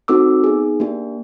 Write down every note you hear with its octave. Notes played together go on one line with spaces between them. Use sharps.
C4 D#4 F#4 A4 D6 E6
B3 D#4 G#4
A#3 D4 G4